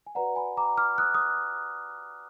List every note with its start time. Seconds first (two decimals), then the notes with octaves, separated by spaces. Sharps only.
0.07 G#5
0.15 F#4 B4 D5 F#5 A#5
0.36 G#5 B5
0.57 A#5 D6
0.77 D6 F6
0.98 D#6 F#6
1.14 D#6